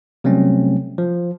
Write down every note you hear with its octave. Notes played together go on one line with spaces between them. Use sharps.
C3 F#3 G3 A3 C4 C#4
F3